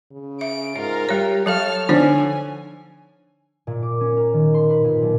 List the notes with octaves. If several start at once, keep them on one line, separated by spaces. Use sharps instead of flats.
C#3
E5 D7
G#2 F4 A#4
G3 G4 C#5
F#3 A4 C#5 F5 A5 F6
D3 F3 D#4 C5 G#5
A#2
D6
C#4
A#4
D#3
C6
B4
A#2
B1